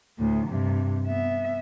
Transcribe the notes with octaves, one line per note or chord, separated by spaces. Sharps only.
D2 A2
G2 C3
B3 E5